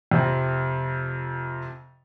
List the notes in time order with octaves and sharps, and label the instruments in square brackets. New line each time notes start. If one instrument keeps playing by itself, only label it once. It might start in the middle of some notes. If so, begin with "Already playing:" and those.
[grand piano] F2 C3